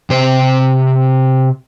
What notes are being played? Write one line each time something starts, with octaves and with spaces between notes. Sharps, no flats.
C3 C5